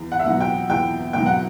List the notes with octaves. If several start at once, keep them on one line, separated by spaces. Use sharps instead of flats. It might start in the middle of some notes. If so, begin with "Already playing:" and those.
Already playing: E2
F#5
E5
B2 F#3 F#5
G5
E2 G5
B2 F#3 G5
F#5